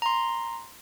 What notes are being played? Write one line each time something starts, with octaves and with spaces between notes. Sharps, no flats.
A#5 C6